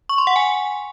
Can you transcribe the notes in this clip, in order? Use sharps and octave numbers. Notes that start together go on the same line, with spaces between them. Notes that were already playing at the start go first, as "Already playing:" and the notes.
C#6
C6
F#5
G#5